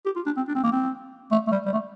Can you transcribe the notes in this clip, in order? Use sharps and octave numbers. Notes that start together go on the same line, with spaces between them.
G4
F4
D4
C4
D4
C4
A#3
C4
A3
A3
G3
G3
A3